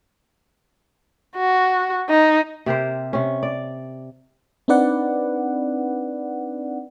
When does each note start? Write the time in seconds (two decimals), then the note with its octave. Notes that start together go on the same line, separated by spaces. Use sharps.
1.36 F#4
2.09 D#4
2.66 C3 G4 A#4 C5
3.13 C3 C#4
3.43 D5
4.68 C4 D4 D#4 B4 D5 F#5